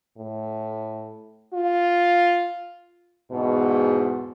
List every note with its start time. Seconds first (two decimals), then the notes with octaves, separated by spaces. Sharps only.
0.17 A2
1.54 F4
3.30 E2 G#2 B2